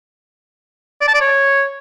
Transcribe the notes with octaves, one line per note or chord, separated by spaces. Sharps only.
D5
A5
D5
C#5